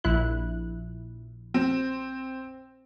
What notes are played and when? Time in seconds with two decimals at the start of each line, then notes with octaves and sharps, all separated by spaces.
0.04 A#1 E4 F#6
1.54 C4